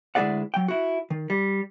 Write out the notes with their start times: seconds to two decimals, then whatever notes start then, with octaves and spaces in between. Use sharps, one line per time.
0.15 D2 G#3 E4 G#4 D5 F#5
0.54 F#3 G5
0.68 E4 F#4
1.10 D#3
1.30 G3